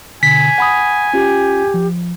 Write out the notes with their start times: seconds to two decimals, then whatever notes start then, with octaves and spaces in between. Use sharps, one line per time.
0.23 B2 D3 G#5 B6
0.58 F#5 B5 D#6
1.14 C#4 F4 G4
1.74 F3